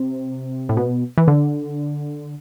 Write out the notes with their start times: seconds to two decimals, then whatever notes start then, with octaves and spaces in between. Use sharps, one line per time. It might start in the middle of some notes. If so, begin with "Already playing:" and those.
Already playing: C3
0.69 A2
0.77 B2
1.18 E3
1.28 D3